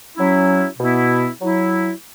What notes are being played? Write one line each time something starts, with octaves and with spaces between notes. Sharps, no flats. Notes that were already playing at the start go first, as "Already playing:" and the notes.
F#3 C#4 E4
B2 B3 E4
F#3 E4